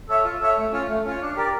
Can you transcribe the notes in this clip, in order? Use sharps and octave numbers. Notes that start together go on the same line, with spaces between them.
A4 C#5 E5
F4
A4 C#5 E5
A3
C#4 F4 C#5
A3
C#4 F4 C#5
D4
G4 A#4 D5